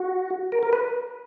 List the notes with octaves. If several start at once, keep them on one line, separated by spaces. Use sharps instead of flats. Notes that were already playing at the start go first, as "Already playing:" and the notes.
Already playing: F#4
A#4
A#4
B4